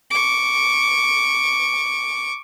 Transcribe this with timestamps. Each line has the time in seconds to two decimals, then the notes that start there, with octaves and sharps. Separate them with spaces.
0.10 C#6 D6